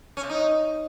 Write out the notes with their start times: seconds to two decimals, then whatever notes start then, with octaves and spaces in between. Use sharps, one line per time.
0.17 C#4
0.23 C3
0.30 D#4